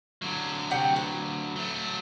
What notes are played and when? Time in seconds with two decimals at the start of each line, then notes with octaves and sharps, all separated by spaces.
0.22 D3 F#3
0.71 C3 F#5 G5
0.96 B4
1.56 F#3 A3